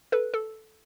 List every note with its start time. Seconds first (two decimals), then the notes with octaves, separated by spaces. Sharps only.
0.12 A4 B4
0.34 A4